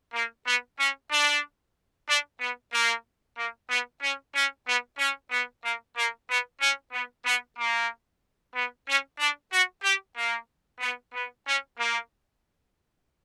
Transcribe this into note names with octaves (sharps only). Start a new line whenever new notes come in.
A#3
B3
C#4
D4
D4
B3
A#3
A#3
B3
C#4
C#4
B3
C#4
B3
A#3
A#3
B3
C#4
B3
B3
A#3
B3
C#4
D4
F#4
G4
A#3
B3
B3
C#4
A#3